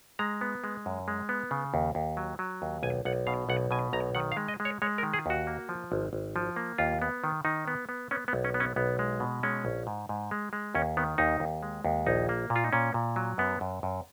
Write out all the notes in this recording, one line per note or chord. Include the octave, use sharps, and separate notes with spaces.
G#3 A#5
B3
G#3
F#2
G#3
B3
C#3
D#2
D#2
F#3
F#3
D#2
B1 G#5
B1 F#5
B2 F5
B1 F#5
B2 G#5
B1 A#5
D#3 F#5
F5
G#3
D#5
G#3
C#5
G#3 C#5
A#4
D#3
G#4
D#2 F#4
A#3
F3
G#1
G#1
F3
A#3
D#2 F4
B3
D#3
D#3 D#4
B3
B3
B3 C#4
B3
B1
C#4
B3
C#4
B1 B3
G#3
B2
G#3 C#4
A#1
G#2
G#2
G#3
G#3
D#2 C#4
D#3 B3
D#2 D#4
D#2
G#3
D#2
A#1 D#4
A#3
A#2
F4
D#4
A#2 C#4
A#2
F#3
F#2 B3
F#2
F#2